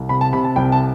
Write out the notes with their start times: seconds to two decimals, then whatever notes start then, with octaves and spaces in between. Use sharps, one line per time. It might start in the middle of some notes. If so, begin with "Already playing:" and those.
Already playing: C2
0.09 C3 B5
0.21 A5
0.33 C3 B5
0.44 A5
0.56 C2 G5
0.72 A5